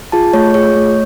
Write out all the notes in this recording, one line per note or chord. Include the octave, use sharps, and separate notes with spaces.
F4 G#4 A5
A3 C#5
F4 G#4 C#5
A3